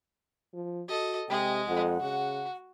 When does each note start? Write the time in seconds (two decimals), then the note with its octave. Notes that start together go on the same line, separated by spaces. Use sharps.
0.54 F3
0.89 F#4 A4 D#5
1.29 C3 G#3 D#5 G5
1.68 F2 F#5
2.01 C#3 F#4